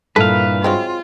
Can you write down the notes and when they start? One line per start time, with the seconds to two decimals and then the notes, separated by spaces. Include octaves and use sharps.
0.16 G2 A#2 E4 A4 B4 F5
0.64 F#3 G#3 C4 F4